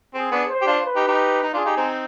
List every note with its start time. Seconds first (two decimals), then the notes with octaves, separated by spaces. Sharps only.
0.14 C4 G#4
0.31 B3 D4
0.49 C5
0.61 G4
0.66 D4 F4
0.84 B4
0.96 D#4 G4
1.07 D#4 G4
1.43 D#4
1.53 D4 F4 G#4
1.65 D#4 G4
1.77 C4 D#4